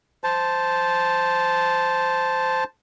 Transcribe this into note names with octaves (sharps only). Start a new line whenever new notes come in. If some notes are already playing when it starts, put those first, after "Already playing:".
C5 A5